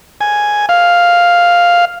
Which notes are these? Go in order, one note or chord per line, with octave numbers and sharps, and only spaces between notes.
G#5
F5